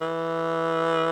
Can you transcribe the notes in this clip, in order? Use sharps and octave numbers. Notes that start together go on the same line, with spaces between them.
E3